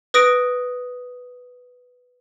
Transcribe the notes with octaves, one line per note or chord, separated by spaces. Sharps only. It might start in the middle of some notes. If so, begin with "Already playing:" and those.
B4 D#6 A#6 D7